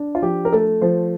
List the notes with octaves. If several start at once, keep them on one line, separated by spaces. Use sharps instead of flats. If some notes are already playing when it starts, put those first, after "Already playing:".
Already playing: D4
F4
F3 G4
A#4
A3 A4
F3 C5